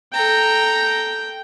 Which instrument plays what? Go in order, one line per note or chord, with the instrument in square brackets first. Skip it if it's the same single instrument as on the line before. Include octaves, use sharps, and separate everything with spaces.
[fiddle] A4 A#5 [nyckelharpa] G5